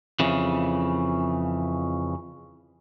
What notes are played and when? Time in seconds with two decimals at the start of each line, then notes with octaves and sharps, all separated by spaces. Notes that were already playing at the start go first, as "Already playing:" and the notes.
0.20 F2 C#3 E3